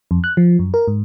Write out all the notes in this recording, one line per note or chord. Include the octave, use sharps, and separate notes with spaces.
F2
F#6
F3
F#2
A#4
G#2